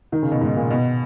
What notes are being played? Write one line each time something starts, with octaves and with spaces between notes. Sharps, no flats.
D#3
C#3
B2
G#2
A#2
B2